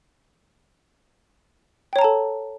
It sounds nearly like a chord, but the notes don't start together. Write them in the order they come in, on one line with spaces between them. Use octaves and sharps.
G5 C#5 A#5 A5 A4